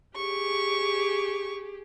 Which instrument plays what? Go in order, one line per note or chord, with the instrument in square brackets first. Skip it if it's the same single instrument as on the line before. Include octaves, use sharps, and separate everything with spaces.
[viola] G4 G#4 [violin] C#6